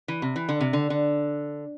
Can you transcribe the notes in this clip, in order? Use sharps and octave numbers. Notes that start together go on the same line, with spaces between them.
E3
C3
E3
D3
C3
D3
D3